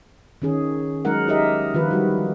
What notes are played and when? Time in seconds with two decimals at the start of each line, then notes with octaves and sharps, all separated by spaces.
0.42 D#3 C#4 G#4
1.05 F#3 G#3 D#4 A#4 F#5
1.28 D#4 G4 A#4 D#5 E5
1.74 D3 D#3 F3 F4 B4
1.91 G3 F#4